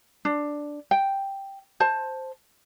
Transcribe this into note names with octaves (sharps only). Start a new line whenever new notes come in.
D4
G5
C5 A5